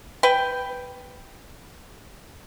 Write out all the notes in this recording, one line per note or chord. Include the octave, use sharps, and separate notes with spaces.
B4 G5